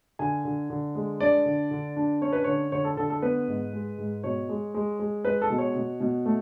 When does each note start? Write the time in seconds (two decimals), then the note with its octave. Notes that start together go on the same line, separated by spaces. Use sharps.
0.19 D3 G#5
0.45 D3
0.70 D3
0.95 G#3
1.20 D4 D5
1.46 D3
1.71 D3
1.96 D4
2.21 C#4 C#5
2.33 B4
2.44 D3 C#5
2.72 D3 C#5
2.85 A4
2.97 D3 A4
3.10 A4
3.22 B3 B4
3.48 G#2
3.73 G#3
3.98 G#2
4.23 B2 C#5
4.49 G#3
4.74 G#3
4.99 G#3
5.25 G#3 B4
5.42 A4
5.50 B2
5.58 C#5
5.75 B2
6.00 B2
6.26 A3